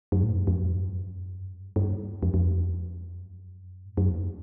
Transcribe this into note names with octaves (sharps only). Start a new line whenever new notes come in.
F#2
A2
F#2
F2
F#2
F2
F#2
G2
G2
F2
F2
F#2
G#2
F#2
F2